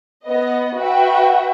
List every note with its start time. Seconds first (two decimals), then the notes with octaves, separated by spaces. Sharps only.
0.25 B3 D#5
0.77 F#4 B4 E5 G5